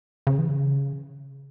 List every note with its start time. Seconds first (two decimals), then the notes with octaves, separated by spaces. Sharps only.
0.27 C#3
0.39 E3
0.49 C#3